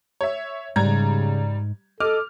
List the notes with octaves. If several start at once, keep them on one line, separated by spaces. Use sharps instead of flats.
C#5 E5
G#2 C#3 G3 A#5 G#6
A4 D#5 D6 F6